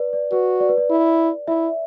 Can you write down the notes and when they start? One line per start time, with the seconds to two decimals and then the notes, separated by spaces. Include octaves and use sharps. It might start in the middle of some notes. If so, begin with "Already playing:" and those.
Already playing: B4 D5
0.13 D5
0.32 F#4 B4
0.60 D5
0.69 B4
0.77 D5
0.90 E4
1.47 E4 E5